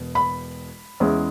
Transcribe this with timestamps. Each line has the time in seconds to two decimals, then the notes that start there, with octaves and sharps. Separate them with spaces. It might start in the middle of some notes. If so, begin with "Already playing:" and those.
Already playing: E1 B2
0.15 B5
1.00 E2 E3 G#3 C#4